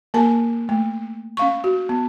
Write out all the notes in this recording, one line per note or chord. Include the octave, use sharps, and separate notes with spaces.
A#3 A#4 G#5 A5
A3
C#4 F5 C#6
F#4
B3